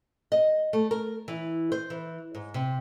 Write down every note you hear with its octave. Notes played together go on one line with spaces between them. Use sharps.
D#5
A3
A#4
E3
C5
E3
G#2
C3